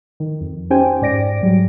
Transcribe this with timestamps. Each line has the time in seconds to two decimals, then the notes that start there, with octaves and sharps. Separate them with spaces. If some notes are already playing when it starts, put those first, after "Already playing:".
0.20 D#3
0.41 F2
0.70 C#4 D#4 G4 C5 G5 G#5
1.02 G#2 D5 A#6 D7
1.42 G#2 F#3 G3